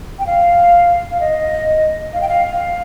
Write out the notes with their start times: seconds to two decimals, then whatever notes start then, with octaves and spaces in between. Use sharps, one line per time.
0.19 G5
0.26 F5
1.11 F5
1.20 D#5
2.13 F5
2.21 G5
2.28 F5